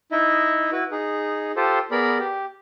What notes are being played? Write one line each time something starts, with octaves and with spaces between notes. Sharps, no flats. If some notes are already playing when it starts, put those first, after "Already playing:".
D#4 E4 D#5 E5
E4 F#4 B4
D#4 G#4
F4 G4 A4 C5
B3 G#4 A#4 D5 B5
G4